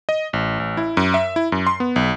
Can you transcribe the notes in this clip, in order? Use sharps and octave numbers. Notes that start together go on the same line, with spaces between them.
D#5
A1
A1
E4
F#2
E5
E4
F#2
C6
B3
B1